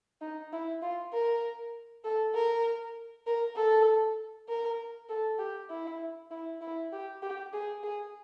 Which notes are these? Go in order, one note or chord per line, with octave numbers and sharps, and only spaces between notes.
D#4
E4
F4
A#4
A4
A#4
A#4
A4
A#4
A4
G4
E4
E4
E4
G4
G4
G#4
G#4